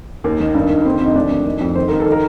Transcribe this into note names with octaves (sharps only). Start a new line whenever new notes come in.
D#2 A#3
D#3
G2
D#3
A#3
D3 C4
F2 D#4
D2 D4
D#3
D#3
F2
D#3 C5
D#3 A#4
A4
D#3
A#4